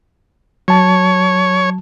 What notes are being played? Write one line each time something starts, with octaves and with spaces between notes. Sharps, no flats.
F#3 C#5 A5